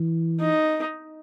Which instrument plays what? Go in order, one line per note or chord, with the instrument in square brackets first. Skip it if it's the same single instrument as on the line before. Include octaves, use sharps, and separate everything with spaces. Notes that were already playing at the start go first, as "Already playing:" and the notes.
Already playing: [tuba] E3
[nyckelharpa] D#4